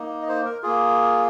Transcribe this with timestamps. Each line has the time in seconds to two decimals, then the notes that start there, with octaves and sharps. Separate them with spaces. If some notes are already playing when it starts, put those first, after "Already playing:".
Already playing: A#3 D#4
0.22 D#5
0.29 C5
0.46 A#4
0.63 A#3 F4 G#4